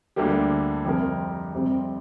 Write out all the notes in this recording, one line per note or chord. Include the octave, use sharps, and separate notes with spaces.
D2 D3 G3 A#3 G4
F2 C3 G3 C4 A#4
F2 C3 G3 C4